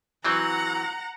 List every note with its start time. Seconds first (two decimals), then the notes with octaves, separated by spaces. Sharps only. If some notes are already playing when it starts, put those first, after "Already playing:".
0.25 E3 F#3 C4 F#5 A#5